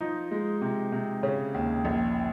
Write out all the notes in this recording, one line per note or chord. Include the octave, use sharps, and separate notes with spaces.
F3 D#4
G#3
C3
C3
C#3 C#4
D#2
A#1